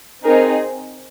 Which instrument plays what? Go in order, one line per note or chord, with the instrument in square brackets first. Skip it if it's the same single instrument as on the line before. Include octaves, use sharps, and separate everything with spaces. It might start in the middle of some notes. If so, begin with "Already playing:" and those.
[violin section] C4 D#4 G#4 A#4